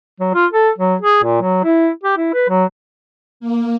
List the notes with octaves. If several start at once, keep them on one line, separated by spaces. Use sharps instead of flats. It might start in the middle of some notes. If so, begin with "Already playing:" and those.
F#3
F4
A4
F#3
G#4
A#2
F#3
E4
G4
E4
B4
F#3
A#3